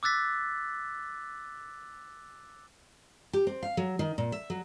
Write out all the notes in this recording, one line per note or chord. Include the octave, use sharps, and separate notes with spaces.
D6 E6 F#6 A6 B6
G4
C4
F5
F#3
D#3
A#2
E5
F#3